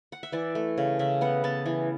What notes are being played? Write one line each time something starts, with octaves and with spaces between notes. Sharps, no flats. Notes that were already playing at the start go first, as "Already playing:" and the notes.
F#5
E5
E3 D5
A3
C#3
C#3 E5
B3 F#5
B3 A5
E3